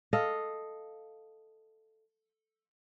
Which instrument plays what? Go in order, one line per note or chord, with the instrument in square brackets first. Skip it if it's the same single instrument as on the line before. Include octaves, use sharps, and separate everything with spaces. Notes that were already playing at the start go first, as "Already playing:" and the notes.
[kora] A4 D#5 F5